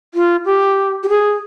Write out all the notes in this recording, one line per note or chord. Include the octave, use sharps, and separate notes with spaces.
F4
G4
G4
G#4